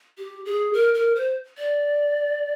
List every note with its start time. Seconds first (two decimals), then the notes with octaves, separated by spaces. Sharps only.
0.18 G4
0.45 G#4
0.74 A#4
0.94 A#4
1.16 C5
1.58 D5